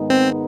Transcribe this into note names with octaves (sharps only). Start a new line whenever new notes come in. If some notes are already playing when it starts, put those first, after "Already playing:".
Already playing: G#2 D#3 G#3 B3 D#4
C4